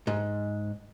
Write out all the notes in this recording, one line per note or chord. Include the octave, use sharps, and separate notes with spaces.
G#2